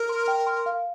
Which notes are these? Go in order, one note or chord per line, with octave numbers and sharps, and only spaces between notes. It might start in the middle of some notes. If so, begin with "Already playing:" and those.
Already playing: A#4
C6
G5
C6
F5